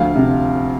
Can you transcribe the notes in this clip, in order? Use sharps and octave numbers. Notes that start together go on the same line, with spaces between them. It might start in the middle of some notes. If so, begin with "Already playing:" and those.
Already playing: D2 F3 F5
C3